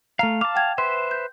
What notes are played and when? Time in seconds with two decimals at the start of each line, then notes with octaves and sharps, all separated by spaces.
0.19 A3 F5 A#5 F6 F7
0.41 F5 A5 D6
0.55 F#5 G5 G#6
0.78 B4 C5 E5 C6
1.11 G6